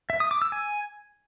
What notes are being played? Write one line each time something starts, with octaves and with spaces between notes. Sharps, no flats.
E5
D#6
D6
E6
G#5